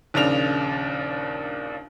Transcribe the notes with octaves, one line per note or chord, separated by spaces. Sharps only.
A#1 D#2 C#3 D4 F7